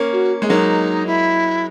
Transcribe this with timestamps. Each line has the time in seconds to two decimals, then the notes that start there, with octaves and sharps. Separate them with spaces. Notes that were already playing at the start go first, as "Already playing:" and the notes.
Already playing: A#3 C#4
0.12 F#4
0.42 G#3
0.50 F#3 A#3 D#4
1.06 E4